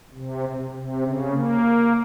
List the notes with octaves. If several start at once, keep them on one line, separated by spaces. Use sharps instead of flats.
C3
C3
C#3
A#3